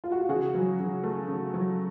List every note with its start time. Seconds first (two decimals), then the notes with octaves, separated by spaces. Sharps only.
0.04 F4
0.12 F#4
0.21 G4
0.29 C#3 F#4 G#4
0.54 F#3
0.80 C#3
1.04 A3
1.28 C#3
1.54 F#3